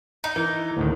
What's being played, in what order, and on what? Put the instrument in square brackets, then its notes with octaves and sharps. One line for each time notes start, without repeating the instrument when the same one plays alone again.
[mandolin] D#4 [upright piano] A#5
[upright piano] E3 [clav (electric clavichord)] A#4
[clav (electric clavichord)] D2 A2 D#3